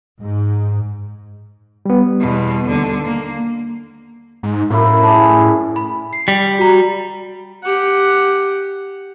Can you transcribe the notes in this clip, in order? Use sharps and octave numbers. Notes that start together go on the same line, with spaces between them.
G#2
G3 B3
E2 B2
D#2 D3
A#3
G#2
F#2 A2 E4
D4 G#4
B5
C7
G3
F#4 A#5
G4 F#5